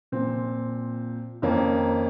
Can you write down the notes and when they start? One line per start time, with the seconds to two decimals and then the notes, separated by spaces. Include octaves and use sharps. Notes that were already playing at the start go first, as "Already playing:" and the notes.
0.12 A#2 F3 C4
1.42 F2 D#3 A#3 C#4